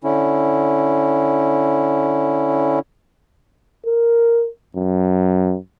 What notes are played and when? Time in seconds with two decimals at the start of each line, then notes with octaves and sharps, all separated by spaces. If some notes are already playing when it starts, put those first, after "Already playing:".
0.04 D3 C#4 E4
3.86 A#4
4.76 F#2